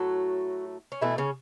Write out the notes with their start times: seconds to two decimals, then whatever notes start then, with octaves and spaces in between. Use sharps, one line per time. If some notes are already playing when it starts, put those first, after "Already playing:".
Already playing: A2 F#3 A3 F#4
0.92 C#4
1.01 B2 E3 A3 E4
1.18 C#3 C#4